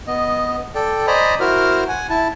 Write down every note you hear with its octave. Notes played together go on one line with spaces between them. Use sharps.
B3 D#5
A4 D5 G5
C5 D5 D#5 G#5 A#5 B5
E4 F#4 A#4 C5 F6
F#5 G#5
E4 A5